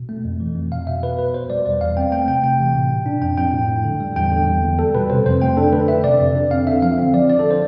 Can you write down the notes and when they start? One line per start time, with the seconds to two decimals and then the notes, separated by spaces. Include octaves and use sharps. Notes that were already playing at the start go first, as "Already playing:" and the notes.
Already playing: B2
0.09 A3
0.24 F2
0.40 E3
0.56 F2
0.72 B2 F5
0.87 B2 E5
1.02 B2 B4
1.19 B2 B4
1.34 B2 C5
1.50 G3 D5
1.66 E2 D5
1.81 E2 F5
1.97 C4 G5
2.12 A3 G5
2.28 C3 G5
2.44 C3 G5
2.60 E3
2.75 A2
2.91 B2
3.06 D4
3.22 F2 G5
3.38 F2 G5
3.54 A2
3.69 A2
3.85 D3
4.00 G3
4.16 E2 G5
4.32 D3
4.47 E2
4.63 E2
4.79 G3 A4
4.94 B2 B4
5.10 C3 C5
5.26 F2 C5
5.42 A3 G5
5.57 D4 A4
5.73 D3 B4
5.88 D3 E5
6.04 C3 D5
6.20 F2
6.35 D3
6.50 C4 F5
6.67 D3 E5
6.82 F3 F5
6.98 C4
7.13 F3 D5
7.29 D3 D5
7.39 A4
7.45 D3
7.51 C5